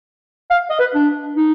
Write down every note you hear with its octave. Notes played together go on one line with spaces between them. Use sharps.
F5
D#5
B4
D4
D#4